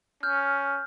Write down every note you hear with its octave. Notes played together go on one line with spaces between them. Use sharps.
C#4 F6 G6